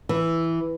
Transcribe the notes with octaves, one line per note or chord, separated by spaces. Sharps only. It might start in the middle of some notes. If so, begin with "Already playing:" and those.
E3